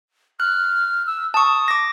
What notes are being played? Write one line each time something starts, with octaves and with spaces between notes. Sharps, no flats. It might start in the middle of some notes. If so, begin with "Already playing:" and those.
F6 F#6
E6
A5 C#6 D#6
D6 A#6